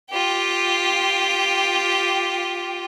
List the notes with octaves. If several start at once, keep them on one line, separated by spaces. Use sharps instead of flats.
F4 G4